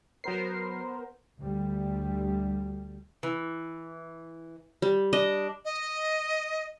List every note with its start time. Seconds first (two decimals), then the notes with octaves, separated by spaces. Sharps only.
0.24 F#3 B3 A#4 C5 C7
1.37 D2 G3
3.23 E3
4.82 G3
5.13 D4 D#5
5.65 D#5